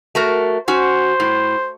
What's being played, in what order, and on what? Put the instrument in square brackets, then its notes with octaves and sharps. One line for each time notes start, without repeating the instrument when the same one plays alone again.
[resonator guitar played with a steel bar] A3 F#4 A#4
[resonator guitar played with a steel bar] C#4 F#4 [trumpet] C5
[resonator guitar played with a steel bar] A2